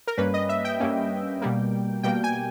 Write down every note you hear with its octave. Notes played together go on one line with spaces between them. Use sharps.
A#4
G2 G3 A#3 C#4 B4
D#5
E5
G5
G2 G3 A#3 C#4
B2 G3 A#3
B2 G3 A#3 G5
G#5